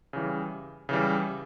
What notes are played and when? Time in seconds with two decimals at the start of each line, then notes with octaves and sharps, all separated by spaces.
0.13 C#3 E3 G3
0.89 C#3 E3 G3